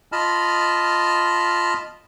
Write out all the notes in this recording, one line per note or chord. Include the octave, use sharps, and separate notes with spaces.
F4 D#5 A5 B5 F6